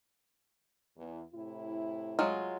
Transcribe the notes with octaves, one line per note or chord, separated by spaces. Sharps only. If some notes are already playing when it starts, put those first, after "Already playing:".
E2
A2 C3 E4
F#3 G#3 F4